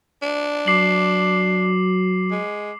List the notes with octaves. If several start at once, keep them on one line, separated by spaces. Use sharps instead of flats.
D4
F#3 D6 C7 F#7
G#3